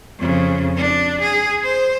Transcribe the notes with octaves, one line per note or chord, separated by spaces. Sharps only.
F2 C#3
D4
G#4
C5